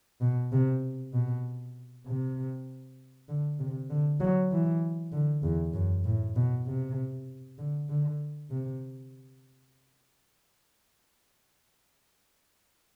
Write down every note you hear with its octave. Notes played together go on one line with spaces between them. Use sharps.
B2
C3
B2
C3
D3
C3
D3
F#3
E3
D3
E2
F#2
A2
B2
C3
D3
D3
C3